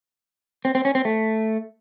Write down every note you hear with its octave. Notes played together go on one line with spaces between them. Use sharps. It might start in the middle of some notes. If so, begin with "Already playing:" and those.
C4
C4
C#4
C4
A3